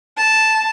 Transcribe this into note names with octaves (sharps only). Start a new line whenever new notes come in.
A5